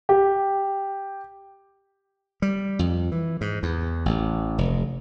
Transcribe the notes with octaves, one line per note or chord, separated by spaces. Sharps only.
G4
G3
F2
E3
G#2
E2
A1
F1